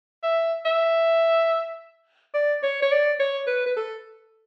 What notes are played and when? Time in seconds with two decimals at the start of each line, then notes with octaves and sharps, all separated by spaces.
0.23 E5
0.65 E5
2.35 D5
2.63 C#5
2.82 C#5
2.92 D5
3.20 C#5
3.47 B4
3.66 B4
3.77 A4